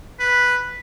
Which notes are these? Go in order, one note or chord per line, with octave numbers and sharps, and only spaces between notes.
B4